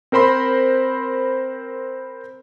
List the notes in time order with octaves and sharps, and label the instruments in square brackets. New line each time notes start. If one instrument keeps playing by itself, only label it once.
[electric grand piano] C4 A#4 C5 B5 C6